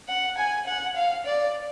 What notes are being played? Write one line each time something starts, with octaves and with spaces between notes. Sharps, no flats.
F#5
G#5
F#5
F5
D5